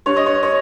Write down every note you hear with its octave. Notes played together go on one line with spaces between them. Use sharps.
G2 C#5
D#5
C#5
C#5